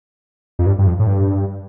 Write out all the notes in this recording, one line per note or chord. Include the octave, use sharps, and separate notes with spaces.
F2
G2
G2
F2
A2
G2